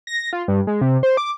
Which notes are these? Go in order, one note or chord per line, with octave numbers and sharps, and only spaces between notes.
A#6
F4
G2
G#3
C3
C5
D6